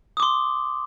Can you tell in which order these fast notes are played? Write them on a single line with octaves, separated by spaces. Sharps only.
D#6 D6 C6